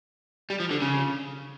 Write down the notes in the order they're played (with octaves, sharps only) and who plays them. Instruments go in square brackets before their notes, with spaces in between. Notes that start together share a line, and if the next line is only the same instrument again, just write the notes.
[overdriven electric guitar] G3
F3
D3
C#3